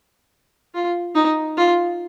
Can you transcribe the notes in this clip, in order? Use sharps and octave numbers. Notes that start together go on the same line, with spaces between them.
F4
D#4
F4